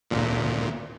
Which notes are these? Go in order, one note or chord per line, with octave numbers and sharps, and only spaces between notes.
G#1 D2 A#2